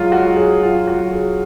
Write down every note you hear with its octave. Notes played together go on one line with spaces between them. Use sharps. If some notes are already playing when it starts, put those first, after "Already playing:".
Already playing: F#3 G#3 F4
F#4
F#3
G#4
F#3 F4
F#4
F#3
G#4